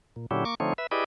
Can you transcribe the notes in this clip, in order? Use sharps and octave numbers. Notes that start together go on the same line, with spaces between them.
A#2
A#2 D3 F#3 C#4 E4 G4
A#3 C#6 D6
D3 F3 A3 C4 D#4 C#5
B4 E5
E4 G4 G#4 B4 D5 D#5